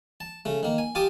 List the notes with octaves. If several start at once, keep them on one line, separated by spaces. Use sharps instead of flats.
A5
C#3 A3
D#3 A#3
G#5
F4 G4 G#5 A5 D6 D#6